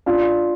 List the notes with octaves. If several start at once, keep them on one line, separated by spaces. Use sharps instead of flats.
D4 F4